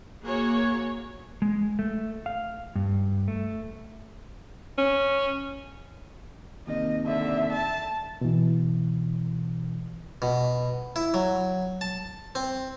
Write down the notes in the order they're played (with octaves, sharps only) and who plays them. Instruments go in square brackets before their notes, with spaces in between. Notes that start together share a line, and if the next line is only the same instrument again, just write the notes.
[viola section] A#3 F#4 G#4 C#5
[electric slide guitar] G#3
A3
F5
G2
A3
[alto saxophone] C#4
[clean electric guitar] D#2 C3 D#3 [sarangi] D#5
[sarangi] D3 [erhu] E5
[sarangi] A5
[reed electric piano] B2 E3
[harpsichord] B2
E4
F#3
A5
C4